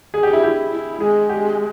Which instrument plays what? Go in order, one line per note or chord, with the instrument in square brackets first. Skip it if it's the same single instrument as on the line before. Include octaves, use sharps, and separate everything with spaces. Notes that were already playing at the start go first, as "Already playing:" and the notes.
[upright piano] G#4
G4
[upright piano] E4 [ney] G4
[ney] E4 [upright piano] G4
[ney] E4
[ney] G#3 [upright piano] G#4
[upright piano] G4